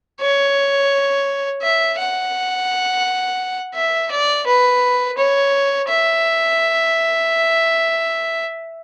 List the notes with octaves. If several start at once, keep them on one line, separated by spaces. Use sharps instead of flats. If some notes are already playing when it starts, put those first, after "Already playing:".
C#5
E5
F#5
E5
D5
B4
C#5
E5